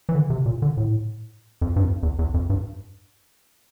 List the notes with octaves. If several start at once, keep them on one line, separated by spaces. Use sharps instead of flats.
E3
D3
C3
A#2
D3
A2
F2
G2
F2
E2
E2
F2
G2